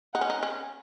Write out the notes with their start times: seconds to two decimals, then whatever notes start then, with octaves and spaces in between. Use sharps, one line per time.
0.14 D#4 F#5
0.21 C#4
0.30 D#4
0.43 C#4